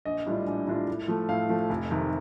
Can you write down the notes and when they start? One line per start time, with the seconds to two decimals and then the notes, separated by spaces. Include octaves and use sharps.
0.05 A#1 D#5
0.26 A2 G3 D4 F4
0.47 A#1
0.67 A2 G3 D4 F4
0.88 A2
1.08 F3 A3
1.29 A2 F5
1.49 F3 A3
1.70 F1
1.90 F2 C3 D#3